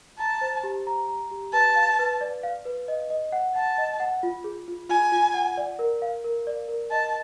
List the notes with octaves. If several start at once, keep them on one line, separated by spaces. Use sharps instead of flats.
A5 A#5
C5
G4
A#5
A#5
G4
B4 A5
F5
B4
D5
F5
B4
D#5
D#5
F#5
F#5 A5
D#5
F#5
F4
G#4
F4
F4 G#5
F4
F#5
D5
A#4
F5
A#4
D5
A#4
D#5 A5